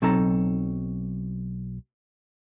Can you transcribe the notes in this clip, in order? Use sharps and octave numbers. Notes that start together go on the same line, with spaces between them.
B1 F#3 C4 D#4 A4 A#5